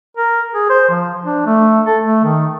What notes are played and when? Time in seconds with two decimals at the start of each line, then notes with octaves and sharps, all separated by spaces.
0.17 A#4
0.54 G#4
0.70 C5
0.90 F3
1.25 D4
1.46 A3
1.86 A4
2.04 A3
2.24 D#3